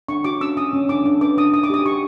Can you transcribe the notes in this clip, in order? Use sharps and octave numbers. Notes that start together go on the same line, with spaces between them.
D4 C#6
F#4 D6
C#4 E6
C#4 D#6
C#4
D4 D6
D4
B4 D6
D4 D#6
D#4 D#6
D6
G4 D#6
G4 C#6